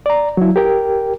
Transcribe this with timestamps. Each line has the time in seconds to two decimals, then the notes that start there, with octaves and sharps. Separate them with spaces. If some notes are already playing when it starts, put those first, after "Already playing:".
0.06 D5 A#5
0.37 F#3 E4
0.56 G4 A#4 G5